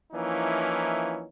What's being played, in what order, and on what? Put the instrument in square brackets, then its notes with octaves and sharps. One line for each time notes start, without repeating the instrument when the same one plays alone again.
[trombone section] E3 F3 A#3 C#4 D#4 E4